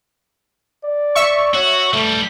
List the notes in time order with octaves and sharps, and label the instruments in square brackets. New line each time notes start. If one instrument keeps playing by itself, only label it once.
[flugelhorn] D5
[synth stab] E5 C#6
[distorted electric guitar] F#4 [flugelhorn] C#5
[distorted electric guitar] E3 G3 [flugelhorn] A3